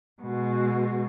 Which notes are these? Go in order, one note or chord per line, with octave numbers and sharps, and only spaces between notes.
B2 G#3